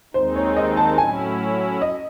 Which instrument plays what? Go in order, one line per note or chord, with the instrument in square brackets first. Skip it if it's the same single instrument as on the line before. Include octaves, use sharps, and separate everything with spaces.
[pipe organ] D#2 D#3 G#3 C4 D#4 [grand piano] C5
[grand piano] C#5
D#5
A5
[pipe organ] A2 F#3 C#4 E4 [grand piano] G#5
[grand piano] D#5